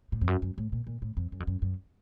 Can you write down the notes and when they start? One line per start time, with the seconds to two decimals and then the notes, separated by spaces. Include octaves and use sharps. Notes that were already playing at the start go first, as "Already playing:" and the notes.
0.12 A2
0.21 F2
0.27 F#2
0.42 F#2
0.58 A2
0.72 A#2
0.87 A#2
1.02 A2
1.17 F2
1.32 F#2
1.40 F2
1.47 F#2
1.62 F#2